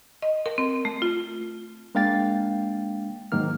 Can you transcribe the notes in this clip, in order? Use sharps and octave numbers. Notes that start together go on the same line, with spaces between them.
D#5
A#4
C4
A3
F4
G#3 A#3 D4 F5 G5 A6
G#2 D#3 F#3 A#3 F6